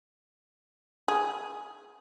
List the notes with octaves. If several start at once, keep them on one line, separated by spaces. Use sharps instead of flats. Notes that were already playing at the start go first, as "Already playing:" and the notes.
G#4